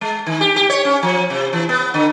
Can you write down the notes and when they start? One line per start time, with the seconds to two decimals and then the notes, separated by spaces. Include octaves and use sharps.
0.01 G#3
0.27 D#3
0.41 G4
0.56 G4
0.70 C#5
0.85 C#4
1.03 F3
1.30 C3
1.53 E3
1.69 B3
1.94 D3